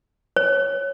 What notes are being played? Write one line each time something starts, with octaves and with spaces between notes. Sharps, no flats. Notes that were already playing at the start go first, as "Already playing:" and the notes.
C#5